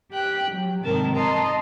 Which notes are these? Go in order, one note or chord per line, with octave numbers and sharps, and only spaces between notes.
G4 G5 F#6
F#3
G#2 C3 D#3 A#4 A5
D#5 A5 A#5 C6